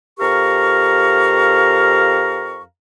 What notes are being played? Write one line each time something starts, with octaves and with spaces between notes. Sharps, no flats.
F2 G4 A#4 F5 A#5 C#6